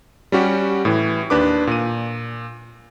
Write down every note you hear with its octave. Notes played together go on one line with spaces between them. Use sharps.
G3 C#4 F#4 G4
A2 E3
D#2 D4 B4 D6
A#2 D#7